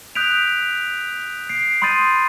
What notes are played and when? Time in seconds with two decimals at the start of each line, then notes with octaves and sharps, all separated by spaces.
0.15 D#6 F#6 G6 B6 D7 F7
1.50 C7 D7
1.82 B5 C6 D#6 G6 A6 D#7